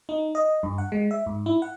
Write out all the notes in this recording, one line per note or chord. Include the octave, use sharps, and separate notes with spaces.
D#4
D#5
G2
F#5
G#3
E5
G#2
E4
F#5